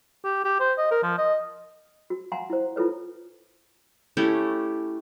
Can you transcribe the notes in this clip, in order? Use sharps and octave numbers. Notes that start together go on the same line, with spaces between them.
G4
G4
C5
D#5
A#4
F3
D#5
F#4
F5 F#5 G#5 A#5 C6
E4 C5
E4 F4 A4 B4 C#5
A3 C#4 E4 G4